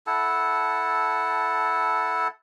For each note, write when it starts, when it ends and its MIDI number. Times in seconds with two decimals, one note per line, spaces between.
0.07 2.28 64
0.07 2.28 69
0.07 2.28 78
0.07 2.28 81